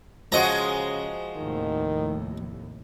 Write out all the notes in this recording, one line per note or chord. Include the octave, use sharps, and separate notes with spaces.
C#3 F3 G#3 F#4 D#5 A#5
F1 D#2 A2 D#3